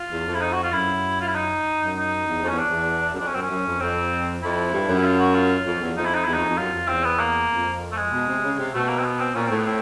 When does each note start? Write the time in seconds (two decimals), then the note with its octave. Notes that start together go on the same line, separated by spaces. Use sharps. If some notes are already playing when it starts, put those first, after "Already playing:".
Already playing: F4
0.11 E2
0.26 F2
0.34 E4
0.41 D#4
0.53 F#4
0.63 F4
0.72 F#2 E4
1.21 F4
1.27 E4
1.35 D#4
1.81 F#2
1.96 D#4
2.27 E2
2.42 F2
2.48 E2 C#4
2.58 D4
2.70 E2
3.13 F#2
3.19 F2 D4
3.27 C#4
3.34 F#2 C4
3.41 C#4
3.50 F#2
3.66 F2
3.80 F2 C4
4.42 F2 E4
4.73 G2
4.89 F#2
4.98 E4
5.04 F4
5.19 F#4
5.34 F4
5.66 F2
5.81 E2
5.96 F2 D#4
6.05 E4
6.14 D#4
6.25 E2 E4
6.34 F2 D#4
6.48 F2
6.58 F#2 F4
6.74 F2
6.88 E2 C4
7.04 B3
7.19 A#3
7.51 F2
7.92 A3
7.97 G#3
8.11 B2
8.28 C3
8.43 C#3
8.58 C3
8.74 B2 A3
8.88 A#3
8.99 C4
9.04 B3
9.20 C4
9.35 A#2 C#4
9.46 A2 C4
9.56 B3
9.66 C4